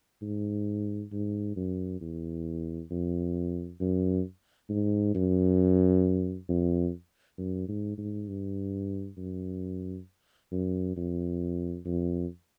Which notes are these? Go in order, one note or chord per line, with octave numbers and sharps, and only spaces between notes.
G#2
G#2
F#2
E2
F2
F#2
G#2
F#2
F2
F#2
G#2
G#2
G2
F#2
F#2
F2
F2